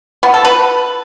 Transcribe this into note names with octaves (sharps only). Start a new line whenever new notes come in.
B3
A4
B4